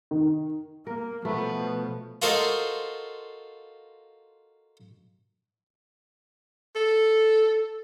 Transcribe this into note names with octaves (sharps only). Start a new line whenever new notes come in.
D#3
A#3 A#4
B2 F3 A3 B3
F4 F#4 A4 A#4 C5 D#5
A4